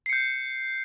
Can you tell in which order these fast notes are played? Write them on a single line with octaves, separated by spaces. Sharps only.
C7 C#7 G6